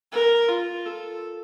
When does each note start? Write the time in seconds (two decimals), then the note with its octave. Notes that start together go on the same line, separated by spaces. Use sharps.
0.12 A#4
0.48 F4
0.86 A4